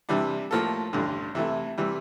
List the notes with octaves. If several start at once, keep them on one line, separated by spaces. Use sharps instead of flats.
C3 E3 G3 D4
A2 F3 A#3 F4 A4
A1 G2 D3
C3 E3 A3 E4
C3 E3 G3